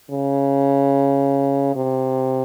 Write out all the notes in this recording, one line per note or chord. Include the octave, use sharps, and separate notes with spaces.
C#3
C3